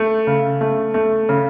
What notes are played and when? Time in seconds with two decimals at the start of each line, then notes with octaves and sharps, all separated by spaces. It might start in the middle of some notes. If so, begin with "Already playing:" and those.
Already playing: A3
0.27 C#3
0.61 A3
0.94 A3
1.29 C#3